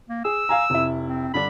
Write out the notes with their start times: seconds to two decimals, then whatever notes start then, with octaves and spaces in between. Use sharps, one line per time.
0.09 A#3
0.25 G#4 E6
0.49 F5 G#5 A#5
0.70 F1 E4
1.06 C4
1.34 G2 D3 D4 B5